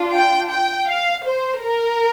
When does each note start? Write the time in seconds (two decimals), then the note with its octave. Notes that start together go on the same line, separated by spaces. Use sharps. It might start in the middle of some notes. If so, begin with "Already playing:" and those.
Already playing: D4 F4
0.13 G5
0.50 G5
0.89 F5
1.26 C5
1.64 A#4